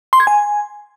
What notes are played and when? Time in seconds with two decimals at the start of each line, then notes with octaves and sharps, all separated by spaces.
0.13 C6
0.20 G#6
0.27 G#5